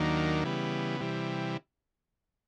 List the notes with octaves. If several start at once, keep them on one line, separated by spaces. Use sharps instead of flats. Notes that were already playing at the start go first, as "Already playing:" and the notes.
Already playing: D#2 D#3 F#3 A#3 D4
C#3 E3 G3 B3
C3 E3 G3